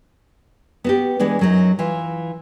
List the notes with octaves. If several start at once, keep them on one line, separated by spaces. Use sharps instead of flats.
B3 F#4 G4
E3 G#3 B3 D4
F#2 F#3 D#4
E3 F4